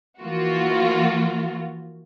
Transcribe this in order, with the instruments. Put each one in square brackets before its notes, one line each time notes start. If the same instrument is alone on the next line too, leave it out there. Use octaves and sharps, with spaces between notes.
[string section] E3 F3 A#3 F4 F#4